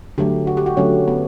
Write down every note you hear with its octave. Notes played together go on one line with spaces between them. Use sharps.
D3 F#3 A3 G4
F#4
G4
F#4
D3 F#3 A3 C#4
B3